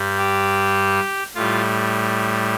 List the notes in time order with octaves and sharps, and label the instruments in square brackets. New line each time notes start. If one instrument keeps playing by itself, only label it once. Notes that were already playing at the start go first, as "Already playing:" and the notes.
Already playing: [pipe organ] G2 G3
G4
A2 G3 F4